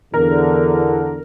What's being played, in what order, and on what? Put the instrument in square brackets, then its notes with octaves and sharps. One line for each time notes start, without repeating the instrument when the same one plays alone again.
[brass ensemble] E2 D3 [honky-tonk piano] A#4